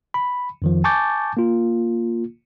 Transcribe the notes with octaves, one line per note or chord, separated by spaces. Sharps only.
B5
F2 D#3 F3
G#5 A5 C#6 D6 G6 A6
A#3 F4